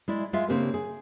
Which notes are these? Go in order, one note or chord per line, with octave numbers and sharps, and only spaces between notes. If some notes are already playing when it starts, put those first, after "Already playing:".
G#3 E4 D5
G#3 F4 G#4 E5 F5
C#3 A#3 C4 D4 G4 A#4
G#4